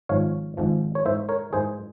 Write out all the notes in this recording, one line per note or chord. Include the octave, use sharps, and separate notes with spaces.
G#1 G#2 F3 C#5 F5
G#1 G#2 F3
C#5
G#2 E3 A#3 C5 E5
A#4 C#5
G#2 E3 A#3 G#4 C5